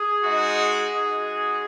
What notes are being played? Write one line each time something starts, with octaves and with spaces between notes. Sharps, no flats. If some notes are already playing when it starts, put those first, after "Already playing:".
Already playing: G#4
G#3 D#4 F#4
G#3 D#4 F#4